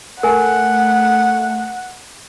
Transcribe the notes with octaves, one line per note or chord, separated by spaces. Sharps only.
A3 A#4 F#5 G#5